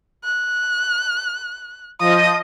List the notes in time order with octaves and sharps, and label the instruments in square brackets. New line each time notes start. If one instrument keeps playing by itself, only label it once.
[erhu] F#6
[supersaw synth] F3 D#5 [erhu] D#6